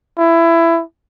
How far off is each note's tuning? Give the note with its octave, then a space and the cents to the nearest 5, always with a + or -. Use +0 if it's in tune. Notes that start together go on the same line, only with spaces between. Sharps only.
E4 +20